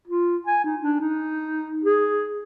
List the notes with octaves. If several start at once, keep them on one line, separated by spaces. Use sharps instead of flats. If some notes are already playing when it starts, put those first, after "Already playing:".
F4
G#5
D#4
D4
D#4
G#4